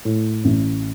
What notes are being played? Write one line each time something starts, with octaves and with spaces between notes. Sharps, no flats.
A2
A1